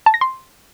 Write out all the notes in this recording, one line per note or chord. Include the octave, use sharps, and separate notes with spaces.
A5
A#6
C6